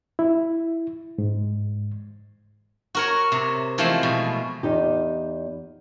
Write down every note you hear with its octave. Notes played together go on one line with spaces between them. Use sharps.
E4
G#2
F#4 A#4 C#5
C3
E3 F3 G#3 A3 C4
B2
E2 D#4 G4